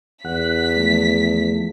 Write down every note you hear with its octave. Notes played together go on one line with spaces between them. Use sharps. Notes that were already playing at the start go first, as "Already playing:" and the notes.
E2 F#5 F#6 B6
F3 A3